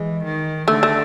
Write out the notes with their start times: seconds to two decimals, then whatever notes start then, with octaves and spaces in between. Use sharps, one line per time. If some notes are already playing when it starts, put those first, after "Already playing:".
Already playing: E3 G#3
0.24 D#3
0.68 D3 A3
0.83 A3